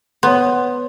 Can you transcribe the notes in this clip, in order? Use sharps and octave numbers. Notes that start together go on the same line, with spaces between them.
B3 C#5 C6